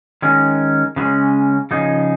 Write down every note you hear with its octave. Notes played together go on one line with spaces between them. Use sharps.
D#3 G#3 C#4
C#3 F3 G#3 C#4
C#3 F3 D#4 G#4